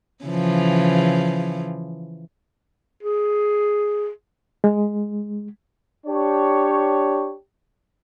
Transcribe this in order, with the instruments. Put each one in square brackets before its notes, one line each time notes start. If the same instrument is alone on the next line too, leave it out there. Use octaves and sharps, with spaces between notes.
[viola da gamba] C#3 E3 F3
[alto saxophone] G#4
[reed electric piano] G#3
[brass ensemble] D4 G4 C#5